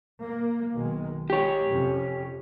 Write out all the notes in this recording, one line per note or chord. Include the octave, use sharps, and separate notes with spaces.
A#3
B1 D#3 G#3
G#3 G4 C#5
F2 C3 C#4